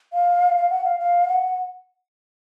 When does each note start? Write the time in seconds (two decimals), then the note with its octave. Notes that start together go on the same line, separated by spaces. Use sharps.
0.13 F5
0.56 F5
0.70 F#5
0.84 F5
0.99 F5
1.28 F#5